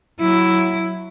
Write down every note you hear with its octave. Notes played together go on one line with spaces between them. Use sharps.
F#3 E4